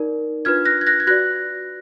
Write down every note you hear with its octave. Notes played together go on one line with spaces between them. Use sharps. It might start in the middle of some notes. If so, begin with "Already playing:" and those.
Already playing: D#4 A#4 D5
D4 F4 B4 F6 G#6
F#6 A#6
G#6
F#6 A#6
G#6
F#4 B4 D5 F#6 A#6